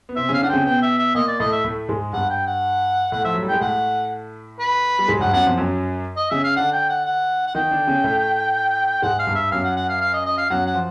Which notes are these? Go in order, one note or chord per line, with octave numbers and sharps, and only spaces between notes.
B3
C3 C4 E5
C#3 C#4 F5
D3 D4 F#5
C#3 C4 C#4 G5
B2 B3 G5
E5
E5
A#2 A#3 D#5
D5
A2 A3 D#5
E5
A2 A3
G#2 G#3
G2 G3 F#5
G5
F#5
A2 A3 F#5
F3 E5
F#3
G3
G#3 G5
A2 A3 F#5
B4
G3
G#2 G#3
F#3
G2 G3 F#5
F#2 F#3 F#5
F2 F3
F#2 F#3
D#5
C#3 C#4 E5
F5
D3 D4 F#5
G5
F#5
F#5
F#5
D#3 D#4 G5
D3 D4
C#3 C#4
A2 A3
G#2 G#3 F#5
F5
G2 G3
E5
F#2 F#3 F5
F#5
F#5
F5
F5
D#5
D#5
F5
F#2 F#3 F#5
F#5
F3